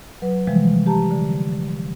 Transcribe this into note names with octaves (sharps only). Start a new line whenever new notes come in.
F#3 B4
C3 E3 F3 G3 G#3
G4 A5 A#5
D3